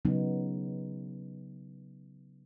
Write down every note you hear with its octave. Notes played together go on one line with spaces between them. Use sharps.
C#3 F#3 B3 D#4